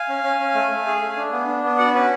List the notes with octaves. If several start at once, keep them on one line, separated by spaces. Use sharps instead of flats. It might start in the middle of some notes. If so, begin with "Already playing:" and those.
Already playing: F5 G#5
C#4
C#4
C#4
A3
A3
G#4
A3
D4
B3
D4
B3
F#4 D5 F#5
C#4 B4